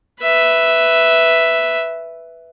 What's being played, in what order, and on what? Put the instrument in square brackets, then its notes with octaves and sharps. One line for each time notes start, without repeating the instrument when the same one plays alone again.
[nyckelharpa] B4 E5